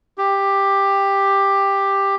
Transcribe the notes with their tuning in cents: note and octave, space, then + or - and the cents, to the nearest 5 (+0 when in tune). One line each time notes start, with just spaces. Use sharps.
G4 +10